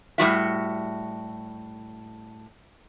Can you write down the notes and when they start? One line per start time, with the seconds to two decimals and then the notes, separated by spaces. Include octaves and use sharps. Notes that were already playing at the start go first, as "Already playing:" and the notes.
0.18 A2 G3 F#4 E5